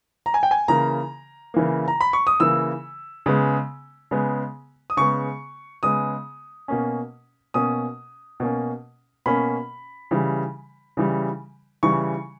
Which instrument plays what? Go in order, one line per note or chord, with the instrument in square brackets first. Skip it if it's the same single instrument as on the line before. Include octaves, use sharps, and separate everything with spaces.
[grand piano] A#5
G#5
G5
G#5
C#3 E3 A#3 A#5
C#3 E3 A#3
A#5
B5
C#6
D#6
C#3 E3 A#3 E6
C#3 G#3 B3
C#3 G#3 B3
D#6
C#3 G#3 B3 C#6
C#3 G#3 B3 D#6
B2 A#3 C#4
B2 A#3 C#4 D#6
B2 A#3 C#4
B2 A#3 C#4 B5
C#3 E3 G3
C#3 E3 G3
C#3 E3 G3 C#6